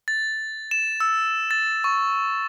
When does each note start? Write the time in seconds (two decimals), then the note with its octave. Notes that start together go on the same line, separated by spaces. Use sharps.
0.08 A6
0.71 E7
1.00 E6
1.51 A6
1.84 C#6